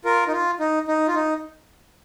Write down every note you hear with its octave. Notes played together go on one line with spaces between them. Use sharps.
F4 A#4
D#4
F4
D#4
D#4
F4
D#4